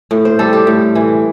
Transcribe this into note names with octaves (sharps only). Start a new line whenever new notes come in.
A2
C5
G3 A4
G4
A2
E3